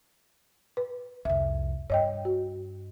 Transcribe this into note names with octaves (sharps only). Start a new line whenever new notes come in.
B4
C2 F2 E5
G2 C#5 D#5 G5
F#4